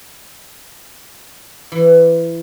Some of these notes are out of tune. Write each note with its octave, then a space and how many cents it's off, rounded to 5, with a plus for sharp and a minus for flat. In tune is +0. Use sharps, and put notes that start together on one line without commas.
E3 +20